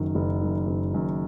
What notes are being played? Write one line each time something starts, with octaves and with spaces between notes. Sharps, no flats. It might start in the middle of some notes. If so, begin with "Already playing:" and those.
Already playing: F#1 F#2 D#3
F#1
F#2 D#3
F#1
F#2 D#3